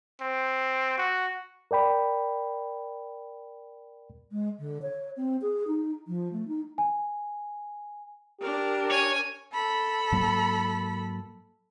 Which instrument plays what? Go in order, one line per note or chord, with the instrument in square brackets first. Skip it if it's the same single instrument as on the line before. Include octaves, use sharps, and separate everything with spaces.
[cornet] C4
F#4
[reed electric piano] A#4 D5 G5 B5
[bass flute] G#3
D3
C#5
C4
G#4
D#4
F3
A3
D#4
[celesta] G#5
[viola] D4 A#4 [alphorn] G4
[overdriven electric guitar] C#5 [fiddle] G#5
[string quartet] A4 B5
[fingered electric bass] G#2 F#3 A#3